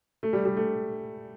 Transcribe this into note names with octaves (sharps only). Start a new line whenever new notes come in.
A3
G3
G3
A3